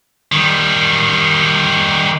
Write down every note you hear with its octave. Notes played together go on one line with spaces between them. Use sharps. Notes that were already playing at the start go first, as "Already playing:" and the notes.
D#3 G3